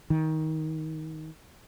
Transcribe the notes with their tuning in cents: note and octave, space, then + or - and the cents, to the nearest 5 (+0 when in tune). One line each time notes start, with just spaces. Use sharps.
D#3 +20